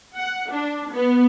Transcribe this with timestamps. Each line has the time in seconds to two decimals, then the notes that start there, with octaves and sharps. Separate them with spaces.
0.16 F#5
0.50 D4
0.93 B3